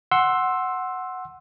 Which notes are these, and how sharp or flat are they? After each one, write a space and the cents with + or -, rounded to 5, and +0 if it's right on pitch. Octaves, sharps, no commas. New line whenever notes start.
F#5 +0 C6 +15 E6 +0